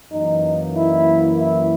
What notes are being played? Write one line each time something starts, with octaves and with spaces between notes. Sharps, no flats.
F#2 E3 A#3 D#4
E4
E4